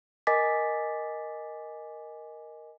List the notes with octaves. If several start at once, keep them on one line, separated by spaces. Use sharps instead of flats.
A#4 D#5 G#5 D6 A6 B6